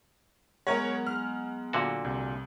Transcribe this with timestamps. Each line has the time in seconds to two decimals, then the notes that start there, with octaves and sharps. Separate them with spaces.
0.67 F#3 G#3 B3 A#4 C#5 F#5 A#5
1.07 F6
1.73 A#2 D3 F#4
2.04 C2